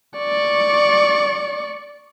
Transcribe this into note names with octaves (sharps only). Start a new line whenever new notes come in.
D5 C#6